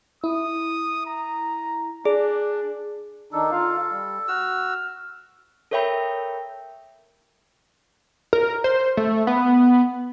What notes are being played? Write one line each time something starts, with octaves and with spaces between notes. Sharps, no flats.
E4 D#6
A#5
D4 G#4 D5
D#3 D4 D#4 A4
F4 F5
G3
F#4 E6 F6
A4 A#4 C#5 E5 G5 B5
A#4
C5
A3
B3